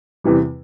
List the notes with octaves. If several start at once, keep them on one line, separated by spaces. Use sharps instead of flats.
E2 C3 E3 G3